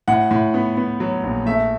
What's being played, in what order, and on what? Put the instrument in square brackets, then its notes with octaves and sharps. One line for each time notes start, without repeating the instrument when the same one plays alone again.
[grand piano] A2 F#5
A2
B3
B3
F#3
A#1
A3 E5